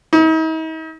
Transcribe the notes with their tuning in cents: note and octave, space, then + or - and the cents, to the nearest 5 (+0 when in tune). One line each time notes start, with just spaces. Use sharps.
D#4 +45